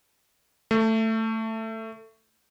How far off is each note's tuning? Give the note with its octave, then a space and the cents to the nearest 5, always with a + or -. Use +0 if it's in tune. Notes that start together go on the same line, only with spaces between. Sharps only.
A3 +15